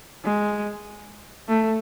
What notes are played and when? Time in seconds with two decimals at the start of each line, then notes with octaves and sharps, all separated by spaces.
0.24 G#3
1.48 A3